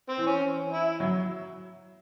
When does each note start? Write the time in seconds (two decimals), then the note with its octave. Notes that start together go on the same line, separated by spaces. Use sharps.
0.09 C4
0.18 E3
0.27 C#4
0.73 E4
1.00 F#3